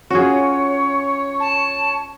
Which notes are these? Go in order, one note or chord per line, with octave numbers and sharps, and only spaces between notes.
C#4 F4 F#4 G#4 C#5
A5